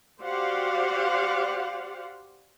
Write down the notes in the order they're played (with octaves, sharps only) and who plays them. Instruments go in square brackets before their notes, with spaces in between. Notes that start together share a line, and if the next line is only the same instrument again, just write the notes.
[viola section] F#4 G4 C5 D5 F5 F#5